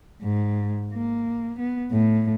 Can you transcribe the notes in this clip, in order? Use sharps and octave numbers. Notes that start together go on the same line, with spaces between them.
G#2
A#3
B3
A2